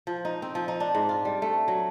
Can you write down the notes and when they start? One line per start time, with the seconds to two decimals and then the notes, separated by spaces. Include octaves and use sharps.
0.07 F3
0.25 D#4
0.42 C4
0.55 F3
0.68 D#4
0.80 D4
0.95 G#2
1.09 F4
1.25 G3
1.42 A3
1.68 F#3